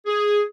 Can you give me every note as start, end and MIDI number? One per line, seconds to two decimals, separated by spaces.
0.06 0.42 68